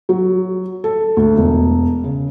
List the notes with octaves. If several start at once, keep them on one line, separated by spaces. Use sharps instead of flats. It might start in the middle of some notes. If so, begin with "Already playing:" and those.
F#3
A4
D2
E1
C#3